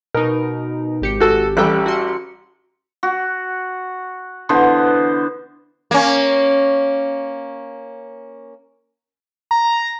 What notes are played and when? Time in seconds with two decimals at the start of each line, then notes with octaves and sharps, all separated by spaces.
0.14 B2 D#4 A#4
1.02 G#1 G4 C#7
1.20 F#4 A4
1.57 A1 G3 A4 G5 F#6
1.86 F#4 C6 C#7
3.03 F#4
4.49 D3 E3 B3 C5
5.91 A#3 C#4
9.51 A#5